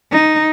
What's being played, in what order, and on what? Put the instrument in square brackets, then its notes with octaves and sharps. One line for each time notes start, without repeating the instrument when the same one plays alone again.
[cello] D#4